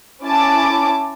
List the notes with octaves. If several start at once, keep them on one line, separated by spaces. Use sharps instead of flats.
C#4 E4 G#5 A5 D6